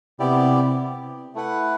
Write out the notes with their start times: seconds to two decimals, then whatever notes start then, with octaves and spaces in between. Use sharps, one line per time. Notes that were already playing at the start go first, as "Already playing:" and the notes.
0.19 C3 B3 E4 G4 D5
1.35 A3 E4 B4 F#5